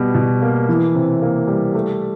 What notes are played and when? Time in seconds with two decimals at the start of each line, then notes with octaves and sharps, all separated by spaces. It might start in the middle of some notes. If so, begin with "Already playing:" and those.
Already playing: B2 G3
0.14 B2
0.42 A#3
0.69 E3
0.95 C3
1.22 A#3
1.47 G3
1.75 A3